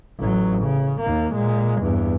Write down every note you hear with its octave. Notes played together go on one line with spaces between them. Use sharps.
A1 F#3
C#3
D#2 A#3
A#2 G#3
E2 G2